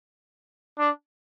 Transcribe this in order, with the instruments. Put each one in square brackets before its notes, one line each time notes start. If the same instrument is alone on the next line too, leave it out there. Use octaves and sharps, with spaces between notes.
[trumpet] D4